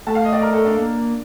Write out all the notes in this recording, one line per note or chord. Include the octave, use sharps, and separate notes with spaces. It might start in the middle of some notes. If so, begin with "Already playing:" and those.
A3 A5
F5
D#5
D5
A#4
A4
D4
A#3